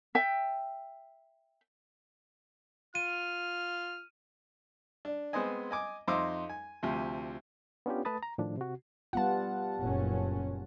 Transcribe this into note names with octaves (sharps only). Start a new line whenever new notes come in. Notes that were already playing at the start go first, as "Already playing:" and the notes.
E5 G5
F4 F6 D#7
D4
G#3 B3 C4 C5 D#5 G#5
D#5 G#5 D6
F2 D#4 C5 E5 D6 D#6
G#5
D2 C3 F3
B3 C#4 D4 F4 G4
A3 B4 A5 B5 D#6 A6
A#5
A2 D#3 F3 D4
C3 F#4
G3 B3 F4 F#5 A5
F#1 A#2 C#4